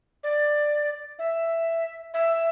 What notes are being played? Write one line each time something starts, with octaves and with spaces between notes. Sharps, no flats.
D5
E5
E5